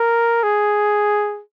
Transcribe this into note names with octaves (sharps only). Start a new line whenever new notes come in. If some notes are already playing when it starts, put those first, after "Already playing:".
Already playing: A#4
G#4